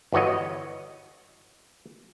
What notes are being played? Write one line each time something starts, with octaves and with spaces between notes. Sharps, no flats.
G1 E3 F#4 C#5 D#5